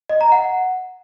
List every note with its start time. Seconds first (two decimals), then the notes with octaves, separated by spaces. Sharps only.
0.09 D#5
0.21 A#5
0.32 F#5